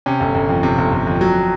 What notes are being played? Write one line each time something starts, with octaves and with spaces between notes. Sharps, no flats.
C3 C#4
G1
G1
F2
C3
G1
G1
F2
F#3